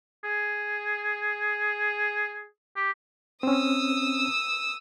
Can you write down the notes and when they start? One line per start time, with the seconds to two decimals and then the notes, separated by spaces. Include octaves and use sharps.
0.24 G#4
2.76 G4
3.43 C4 C#4 D#6 E6